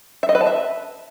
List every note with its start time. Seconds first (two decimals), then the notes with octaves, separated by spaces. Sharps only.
0.23 E5
0.29 D#5
0.35 B4
0.41 A5
0.47 E5